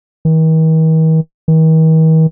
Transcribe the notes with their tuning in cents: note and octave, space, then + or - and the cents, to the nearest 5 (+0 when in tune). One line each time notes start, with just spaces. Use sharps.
D#3 +45
D#3 +45